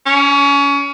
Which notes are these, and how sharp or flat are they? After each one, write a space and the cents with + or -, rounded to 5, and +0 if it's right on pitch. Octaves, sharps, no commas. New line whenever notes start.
C#4 +30